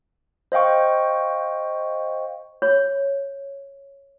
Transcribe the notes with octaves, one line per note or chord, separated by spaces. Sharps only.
C5 D#5 F5 G5 C#6
C#5